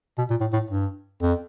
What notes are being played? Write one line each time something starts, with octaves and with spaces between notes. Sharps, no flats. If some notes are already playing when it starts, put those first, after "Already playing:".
B2
A#2
A2
A2
G2
F2